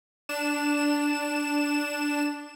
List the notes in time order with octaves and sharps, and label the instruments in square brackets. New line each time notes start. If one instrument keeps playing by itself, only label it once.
[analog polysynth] D4 E7